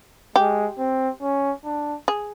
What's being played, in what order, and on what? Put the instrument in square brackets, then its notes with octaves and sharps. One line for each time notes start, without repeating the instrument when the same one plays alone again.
[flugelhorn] G#3 [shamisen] G4
[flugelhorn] C4
C#4
D4
[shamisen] G#4